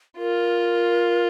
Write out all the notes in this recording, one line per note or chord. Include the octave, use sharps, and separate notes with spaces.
F4 A#4